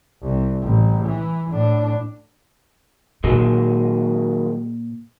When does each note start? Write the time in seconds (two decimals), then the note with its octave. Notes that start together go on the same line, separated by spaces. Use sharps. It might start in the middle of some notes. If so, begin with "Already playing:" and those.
0.22 C2
0.62 A1
1.06 E3
1.51 A2 D4
3.24 A#2 D#3 F#3 G#3